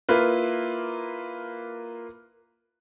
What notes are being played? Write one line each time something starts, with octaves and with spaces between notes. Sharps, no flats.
A#3 E4 F4 B4